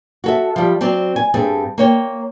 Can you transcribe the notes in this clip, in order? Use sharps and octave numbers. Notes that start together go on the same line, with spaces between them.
F#4 A4 E5
F3 G3
F#3 C4 C5 D5
G#5
G2 C4 G#4 A4
A#3 C#5 G5